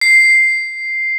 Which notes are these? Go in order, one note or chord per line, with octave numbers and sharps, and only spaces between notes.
C7